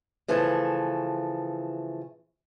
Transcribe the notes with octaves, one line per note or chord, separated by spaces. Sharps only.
C#3 E3 F3 A3 A4